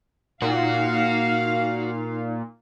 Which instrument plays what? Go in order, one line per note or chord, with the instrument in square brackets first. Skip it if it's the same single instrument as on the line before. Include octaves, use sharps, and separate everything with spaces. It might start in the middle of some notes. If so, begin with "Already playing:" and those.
[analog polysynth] A#2 [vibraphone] D#4 [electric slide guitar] F#4 [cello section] F5